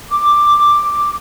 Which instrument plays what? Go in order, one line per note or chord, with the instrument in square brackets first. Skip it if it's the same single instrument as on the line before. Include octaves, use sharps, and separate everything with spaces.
[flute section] D6